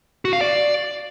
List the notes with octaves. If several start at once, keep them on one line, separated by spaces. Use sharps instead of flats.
F#4
F5
D5